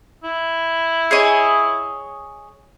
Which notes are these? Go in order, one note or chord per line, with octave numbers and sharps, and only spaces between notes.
E4
G#4 C#5 D#5